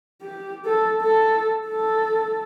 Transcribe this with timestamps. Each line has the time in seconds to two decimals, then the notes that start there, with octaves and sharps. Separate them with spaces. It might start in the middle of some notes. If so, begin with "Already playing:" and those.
0.22 G4
0.65 A4
1.02 A4
1.67 A4